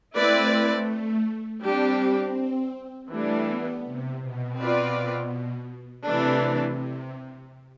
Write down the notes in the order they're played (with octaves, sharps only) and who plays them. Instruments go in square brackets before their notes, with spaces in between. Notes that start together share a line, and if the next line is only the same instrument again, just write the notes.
[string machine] A3 [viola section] C4 E4 B4 D5
[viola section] G3 D4 G4 [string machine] C4
[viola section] E3 G3 D4 [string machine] A3
[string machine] B3
C3
B2
[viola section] C4 F4 B4 D5
[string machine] C3 [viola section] E3 A3 D4